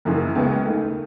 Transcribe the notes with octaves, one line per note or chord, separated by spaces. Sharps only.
F#1 F#2 C#3 E3
C#2 C#3 G#3 B3 E4
D#2 D#3 A3